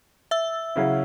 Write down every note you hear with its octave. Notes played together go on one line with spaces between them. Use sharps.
E5 E6
C#3 F#3 C#4 E4